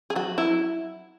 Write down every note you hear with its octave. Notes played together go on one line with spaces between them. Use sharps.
G#4
F#3 F#4
F#3 E4